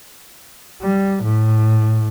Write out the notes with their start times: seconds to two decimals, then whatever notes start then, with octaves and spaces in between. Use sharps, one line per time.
0.82 G3
1.23 A2